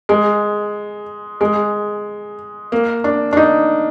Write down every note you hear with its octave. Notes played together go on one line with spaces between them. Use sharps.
G#3
G#3
A#3
D4
D4
D#4